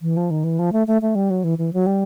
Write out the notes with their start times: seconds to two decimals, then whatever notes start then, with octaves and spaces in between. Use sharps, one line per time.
0.02 E3
0.17 F3
0.30 D#3
0.44 E3
0.59 F3
0.72 A3
0.87 A3
1.02 A3
1.15 G3
1.30 F#3
1.44 E3
1.58 E3
1.73 F#3
1.86 G3